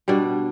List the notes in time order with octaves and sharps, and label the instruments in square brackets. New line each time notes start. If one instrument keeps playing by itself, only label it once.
[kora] B2 G3 D4